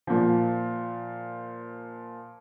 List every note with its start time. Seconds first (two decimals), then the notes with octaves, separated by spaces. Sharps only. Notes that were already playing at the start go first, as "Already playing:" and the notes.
0.07 A#2 F3